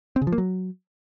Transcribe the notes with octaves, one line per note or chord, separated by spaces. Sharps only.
C4
C#3
F3
A#3
F#3